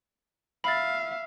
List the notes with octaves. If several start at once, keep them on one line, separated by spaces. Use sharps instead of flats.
E5 F5 B5 A6